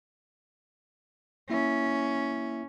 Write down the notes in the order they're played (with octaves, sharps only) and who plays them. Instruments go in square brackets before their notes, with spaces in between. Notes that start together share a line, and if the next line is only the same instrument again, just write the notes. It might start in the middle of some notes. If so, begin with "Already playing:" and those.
[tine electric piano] A#3 E4 E5 [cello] C#4